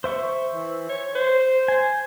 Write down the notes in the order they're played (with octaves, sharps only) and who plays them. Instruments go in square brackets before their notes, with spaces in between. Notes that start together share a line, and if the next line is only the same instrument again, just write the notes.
[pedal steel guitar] C5 E5 C#6
[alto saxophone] E3
C#5
C5
[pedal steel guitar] G#5